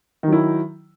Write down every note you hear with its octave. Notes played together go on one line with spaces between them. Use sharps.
D#3 F#3 E4